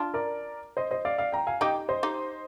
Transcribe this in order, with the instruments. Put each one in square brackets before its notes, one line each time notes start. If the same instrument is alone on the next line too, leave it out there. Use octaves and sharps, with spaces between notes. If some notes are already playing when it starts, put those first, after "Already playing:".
Already playing: [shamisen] D4 F4
[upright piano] A#4 D5
C5 D#5
C5 D#5
D5 F5
D5 F5
G5 A#5
F5 G#5
[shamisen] D#4 G4 [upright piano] D#5 G5
[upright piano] C5 D#5
[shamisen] D#4 G4